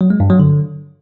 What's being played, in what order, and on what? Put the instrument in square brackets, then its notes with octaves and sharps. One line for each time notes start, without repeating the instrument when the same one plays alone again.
[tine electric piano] F#3
G#3
G2
F#3
D3